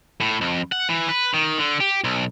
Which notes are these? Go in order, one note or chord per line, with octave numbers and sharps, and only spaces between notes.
A2
F2
F#5
E3
B4
D#3
D3
G4
B1